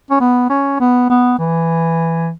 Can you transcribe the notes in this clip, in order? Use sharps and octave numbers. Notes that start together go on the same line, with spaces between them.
C#4
B3
C#4
B3
B3
E3